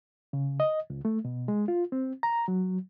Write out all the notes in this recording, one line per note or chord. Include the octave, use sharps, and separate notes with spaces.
C#3
D#5
C#2
A3
B2
G#3
F4
C4
A#5
F#3